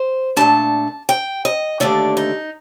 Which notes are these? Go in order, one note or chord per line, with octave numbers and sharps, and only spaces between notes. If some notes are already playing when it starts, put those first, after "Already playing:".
Already playing: C5
A#2 A3 D4 A5
G5
D#5
D#2 D3 A3 D4 D5
D#4